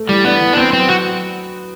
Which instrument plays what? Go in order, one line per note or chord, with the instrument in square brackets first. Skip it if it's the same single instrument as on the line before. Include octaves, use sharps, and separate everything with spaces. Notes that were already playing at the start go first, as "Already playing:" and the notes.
Already playing: [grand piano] A3
[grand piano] E3 [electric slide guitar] G3
[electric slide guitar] B3 [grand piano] D4
[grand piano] E3
[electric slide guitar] D4
[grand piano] B3 [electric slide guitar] C4
[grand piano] F#3 [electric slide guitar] C4
[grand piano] F#3 [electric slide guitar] F#4